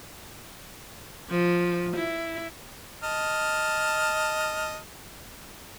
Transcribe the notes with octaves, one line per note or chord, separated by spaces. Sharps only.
F3
E4
D#5 A5 F6